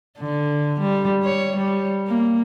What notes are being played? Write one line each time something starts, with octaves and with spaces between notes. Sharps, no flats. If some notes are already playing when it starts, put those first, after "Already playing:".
D3
G3
C#5
G3
A#3